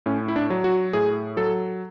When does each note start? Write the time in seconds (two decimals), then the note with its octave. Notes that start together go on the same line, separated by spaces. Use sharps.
0.06 A2 C#4
0.28 E4
0.36 D4
0.50 F#3
0.64 F#4
0.93 A2 G#4
1.37 F#3 A4